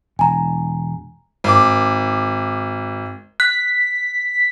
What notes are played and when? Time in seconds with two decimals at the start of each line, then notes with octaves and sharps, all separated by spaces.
0.19 E1 G#5 A#5
1.44 G#1 D6
3.40 F#6 B6